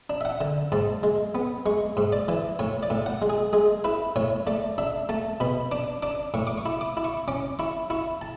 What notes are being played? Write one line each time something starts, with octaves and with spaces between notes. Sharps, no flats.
D4
E5
F#5
D3
G#2 A5
G#3
B3
G#3 C#6
G#2
D5
E3
A2 C#5
D5
A2
F#5
G#3
G#4
G#3 G#4
E4 B4
A2 C#5
A3 D5
D4 E5
A3 A5
B2 B5
D4 D6
D4 D6
A2 C#6
D6
C#6
E4
D6
E4
C#6
C#4 D6
E4 C#6
E4 C#6
A5